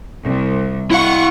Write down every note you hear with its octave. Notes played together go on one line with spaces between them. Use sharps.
C2
E4 F5 F#5 C#6